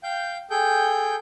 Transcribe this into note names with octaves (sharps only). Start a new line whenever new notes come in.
F5 G5 G6
G#4 A4 G5 G6